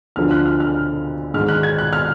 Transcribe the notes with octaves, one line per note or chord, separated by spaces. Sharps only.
D2 D3 F3 F6
F#6
F6
F6
G#2 D#3 F6
F#6
G#6
F#6
F6